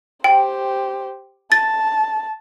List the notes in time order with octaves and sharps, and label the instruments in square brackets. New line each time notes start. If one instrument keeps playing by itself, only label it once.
[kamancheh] G4 C5 [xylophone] G5
[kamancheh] A5 [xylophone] A6